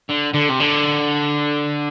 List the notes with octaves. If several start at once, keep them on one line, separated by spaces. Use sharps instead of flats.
D3
D3
C3
D3